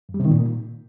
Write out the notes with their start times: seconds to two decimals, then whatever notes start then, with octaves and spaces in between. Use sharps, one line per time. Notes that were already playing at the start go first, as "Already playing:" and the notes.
0.09 F#2
0.14 G3
0.20 C3
0.25 D#3
0.31 A#2